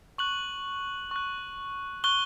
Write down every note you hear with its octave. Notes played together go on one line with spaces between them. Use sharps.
C#6 F#6 F#7
C#6 F#6
C#6 F#6 G7